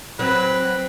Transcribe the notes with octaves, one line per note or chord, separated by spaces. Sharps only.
F#3 C4 B4